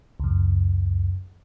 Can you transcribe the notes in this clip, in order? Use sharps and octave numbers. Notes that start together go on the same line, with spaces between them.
C#2 F#2